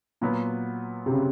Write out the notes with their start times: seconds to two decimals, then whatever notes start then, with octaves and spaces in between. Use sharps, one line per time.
0.21 A#2 F#3 B3
1.06 C3
1.12 C#3